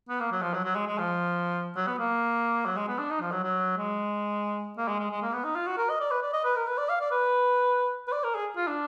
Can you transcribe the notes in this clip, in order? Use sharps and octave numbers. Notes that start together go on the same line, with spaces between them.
B3
A#3
F#3
F3
F#3
F#3
G#3
G#3
F3
F#3
B3
A#3
F#3
G#3
B3
D4
D#4
F3
F#3
F#3
G#3
A#3
G#3
G#3
G#3
A#3
B3
D#4
F4
F#4
A#4
D#5
D5
B4
D5
D#5
B4
A#4
B4
D5
F5
D5
B4
B4
D5
A#4
G#4
F4
D4